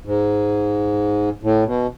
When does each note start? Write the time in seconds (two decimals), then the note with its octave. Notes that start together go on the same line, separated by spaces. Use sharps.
0.05 G#2
1.43 A2
1.66 B2